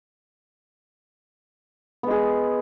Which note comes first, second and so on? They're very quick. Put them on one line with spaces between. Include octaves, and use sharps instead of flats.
B3 G#3 G#4